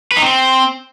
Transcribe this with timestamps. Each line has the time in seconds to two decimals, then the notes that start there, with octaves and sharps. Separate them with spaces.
0.11 B4
0.17 D#4
0.22 C4